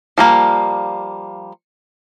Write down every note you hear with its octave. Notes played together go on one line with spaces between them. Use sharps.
F3 G3 A#3